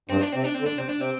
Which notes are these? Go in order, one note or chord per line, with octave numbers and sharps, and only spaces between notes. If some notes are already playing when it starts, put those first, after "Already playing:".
G2 C4
D4
C3 C4
D4
C4
D3
D4
C3 C4
D4
C3 C4